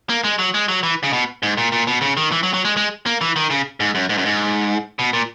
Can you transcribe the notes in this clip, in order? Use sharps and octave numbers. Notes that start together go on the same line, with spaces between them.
A#3
G#3
F#3
G#3
F#3
E3
C#3
B2
G#2
A#2
A#2
B2
C#3
D#3
E3
F#3
F#3
G#3
G#3
A#3
E3
D#3
C#3
G#2
F#2
G#2
F#2
G#2
B2
A#2